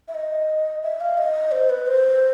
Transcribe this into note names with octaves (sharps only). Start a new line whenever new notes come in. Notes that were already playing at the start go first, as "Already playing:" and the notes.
E5
D#5
E5
F5
D#5
C5
B4
C5